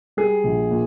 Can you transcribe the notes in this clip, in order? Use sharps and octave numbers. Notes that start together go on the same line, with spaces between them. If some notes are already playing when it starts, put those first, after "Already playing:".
G3 G#4
A#1
A#2